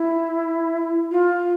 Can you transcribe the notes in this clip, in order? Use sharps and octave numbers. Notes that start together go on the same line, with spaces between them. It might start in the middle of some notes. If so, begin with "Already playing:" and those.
Already playing: E4
F4